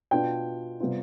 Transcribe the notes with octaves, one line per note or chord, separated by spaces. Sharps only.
B2 B3 D4 F4 G5
C3 G3 B3 F4